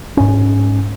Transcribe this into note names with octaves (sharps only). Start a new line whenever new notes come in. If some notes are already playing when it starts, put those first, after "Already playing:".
G#2 C#4